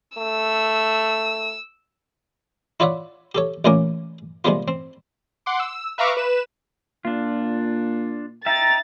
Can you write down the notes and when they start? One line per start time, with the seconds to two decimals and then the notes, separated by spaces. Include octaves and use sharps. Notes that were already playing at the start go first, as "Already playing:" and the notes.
0.18 A3 E6
2.80 E4 F4 C#5 D5 E5 F#5
3.35 G4 A4 C#5
3.65 A1 A#2 E3 C#4 A#4 D6
4.45 C3 G3 G#3 A#3 B3 F4
4.68 C4
5.46 F#5 C6 D6
5.60 E6
5.98 B4 E5 F5 A#5 C#6 D6
6.17 B4 E7
7.05 A#2 D4 F4
8.46 D#4 E5 G5 A#5 A6